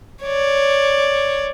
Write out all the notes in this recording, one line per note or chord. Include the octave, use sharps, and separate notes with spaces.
C#5 D5